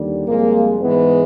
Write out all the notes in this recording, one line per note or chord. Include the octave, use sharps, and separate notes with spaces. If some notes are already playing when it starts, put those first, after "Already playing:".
Already playing: D#2 D3 G3
C2 A#2 F3 G#3 A#3
G#2 E3 G#3 B3